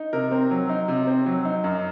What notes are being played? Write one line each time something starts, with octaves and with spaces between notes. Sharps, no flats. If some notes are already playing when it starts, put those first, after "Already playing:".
Already playing: D#4
C3 A#4
C4
F#3
D#4
C3
C4
F#3
D#4
F#2